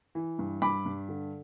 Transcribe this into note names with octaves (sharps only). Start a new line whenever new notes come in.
E3
G2
G2 B5 D6
G2
D3